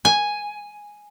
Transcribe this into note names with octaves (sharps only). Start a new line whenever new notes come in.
G#5